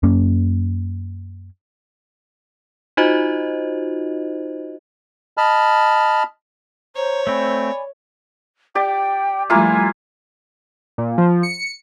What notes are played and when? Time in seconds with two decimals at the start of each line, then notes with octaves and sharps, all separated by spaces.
0.03 F#2 A#3 C#4
2.97 D#4 F4 F#4 C5 D#5
5.37 D#5 A5 B5 F6
6.96 C5 C#5 A#5
7.27 A3 C4 D5 G#5 B5
8.75 G4 D5 G5
9.50 F3 G3 A3 A#3 E4 F4 G#5
10.98 A#2
11.18 F3
11.43 C#7